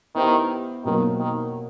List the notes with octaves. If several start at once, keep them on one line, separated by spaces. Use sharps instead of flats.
D#3 B3 E4 G4 C5 E5
B2 D#3 F#3 A#3
D#3